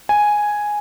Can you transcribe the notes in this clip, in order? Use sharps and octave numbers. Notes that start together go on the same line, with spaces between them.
G#5